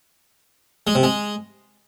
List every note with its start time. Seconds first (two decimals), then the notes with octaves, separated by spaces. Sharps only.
0.87 G#3
0.95 C3
1.03 G#3